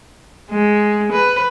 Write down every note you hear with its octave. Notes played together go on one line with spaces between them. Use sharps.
G#3
B4